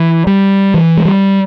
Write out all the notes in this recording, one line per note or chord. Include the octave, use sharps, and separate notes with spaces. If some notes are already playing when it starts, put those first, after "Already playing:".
Already playing: E3
G3
E3
G#3
G3